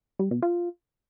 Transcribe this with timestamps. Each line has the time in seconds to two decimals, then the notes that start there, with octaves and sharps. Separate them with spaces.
0.19 G3
0.31 B2
0.42 F4